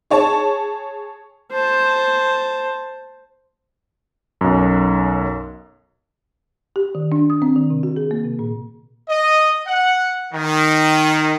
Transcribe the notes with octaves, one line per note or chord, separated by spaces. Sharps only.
G#4 C#5 A5 C#6
C5 A5
B1 F#2
G4
D#3
D4
D#6
C4
D#3
C3
F#4
G#4
A#3
C3
A#2
D#5
F#5
D#3